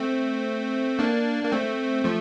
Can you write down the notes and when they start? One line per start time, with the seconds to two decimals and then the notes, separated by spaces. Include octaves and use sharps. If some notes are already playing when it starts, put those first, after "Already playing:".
Already playing: A3 C4
0.99 A#3 D4
1.44 A#3
1.52 A3 C4
2.05 F3 A3